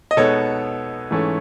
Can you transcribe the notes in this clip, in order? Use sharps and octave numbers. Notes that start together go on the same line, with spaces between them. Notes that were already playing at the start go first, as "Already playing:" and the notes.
D#5
B2 G#3 B3 D#4 A4 C#5
G#2 E3 A3 C#4